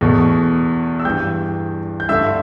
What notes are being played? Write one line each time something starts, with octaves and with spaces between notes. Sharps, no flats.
E2 B2 A3
E6
G2 E3 G3 G5 G6
G6
G2 D3 A3 E5 E6